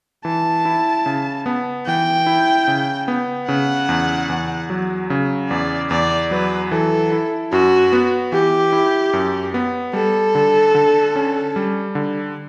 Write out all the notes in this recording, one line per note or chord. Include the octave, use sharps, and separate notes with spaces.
E3 A5
E4
C#3
B3
E3 G5
E4
C#3
B3
C#3 F#5
E2
E2
F#3
C#3
E2 D5
E2 D5
F#3 B4
E3 A4
E4
F#2 F#4
B3
E3 G4
E4
F#2
B3
G3 A4
D3
D3
C#4
G3
D3